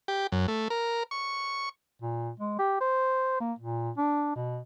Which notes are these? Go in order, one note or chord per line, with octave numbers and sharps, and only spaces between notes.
G4
F#2
A3
A#4
C#6
A#2
G#3
G4
C5
A#3
A#2
D4
B2